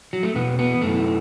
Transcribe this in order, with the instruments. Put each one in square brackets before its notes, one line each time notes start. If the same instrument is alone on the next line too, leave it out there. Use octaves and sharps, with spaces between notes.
[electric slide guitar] F#3
A3
E2 B2 B3
B3
F#2 E3 A3